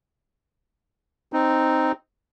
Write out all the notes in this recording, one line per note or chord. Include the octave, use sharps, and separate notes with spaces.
C4 D#4